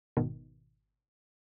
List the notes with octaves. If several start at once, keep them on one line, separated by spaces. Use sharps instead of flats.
G#1 B2 D#3